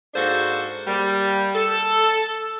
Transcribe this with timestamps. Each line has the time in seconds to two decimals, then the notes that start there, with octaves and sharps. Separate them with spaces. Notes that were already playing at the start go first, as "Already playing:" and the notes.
0.14 G#2 A#3 D4 F#4 A4 C5
0.87 G3 A#3
1.56 A4